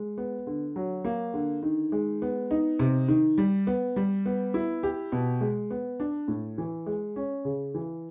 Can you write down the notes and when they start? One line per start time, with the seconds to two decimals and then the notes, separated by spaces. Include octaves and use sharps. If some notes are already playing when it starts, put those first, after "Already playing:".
Already playing: G#3
0.18 B3
0.47 D3
0.76 F#3
1.05 A#3
1.34 D3
1.63 D#3
1.92 G#3
2.22 B3
2.51 D#4
2.79 C3
3.08 D#3
3.38 G3
3.67 B3
3.96 G3
4.26 B3
4.54 E4
4.83 G4
5.12 B2
5.41 G#3
5.71 B3
6.00 D4
6.28 A2
6.58 E3
6.86 G#3
7.16 C#4
7.45 C#3
7.75 E3